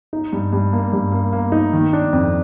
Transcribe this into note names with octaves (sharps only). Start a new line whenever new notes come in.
D#4
G2
G2
A#3
G2
A#3
A#3
D#4
D#3
D4
F2